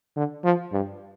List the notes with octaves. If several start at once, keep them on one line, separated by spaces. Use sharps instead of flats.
D3
F3
G2